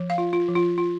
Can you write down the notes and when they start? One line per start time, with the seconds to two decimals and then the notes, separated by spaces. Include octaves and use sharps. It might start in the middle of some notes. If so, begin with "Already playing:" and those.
Already playing: F3
0.10 F5
0.18 F4
0.33 F4
0.48 F3
0.56 F4
0.78 F4